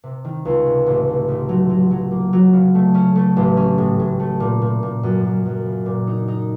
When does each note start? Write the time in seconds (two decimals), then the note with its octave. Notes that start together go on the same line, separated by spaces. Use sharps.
0.04 C3
0.25 D#3
0.45 C#2
0.66 C3
0.86 A1
1.08 A1
1.28 A1
1.49 F#3
1.69 F#3
1.90 F#3
2.11 A#3
2.33 F#3
2.53 C#3
2.75 A3
2.94 C#4
3.15 A3
3.37 A1
3.57 C#4
3.78 A2
4.00 A2
4.20 A3
4.40 A#2
4.62 A#2
4.83 A#2
5.03 F#2
5.24 F#2
5.45 F#2
5.66 C#3
5.86 A#2
6.07 D#4
6.28 D#4